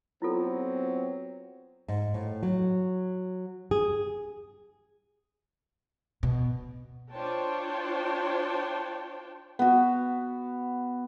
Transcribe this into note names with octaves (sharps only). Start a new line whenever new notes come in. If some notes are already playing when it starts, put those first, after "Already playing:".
F#3 B3 C4 E4 F4 A4
G#2
A2
F#3
G#4
B2
D4 F4 C5 C#5 G5 A5
B3 F#4